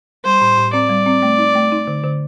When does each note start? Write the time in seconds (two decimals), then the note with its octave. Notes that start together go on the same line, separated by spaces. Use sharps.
0.24 G3 C5
0.41 A2
0.58 A2
0.73 C4 D5
0.90 G3
1.06 C4
1.22 A3
1.38 D#4
1.55 A3
1.72 D#4
1.87 D3
2.04 D3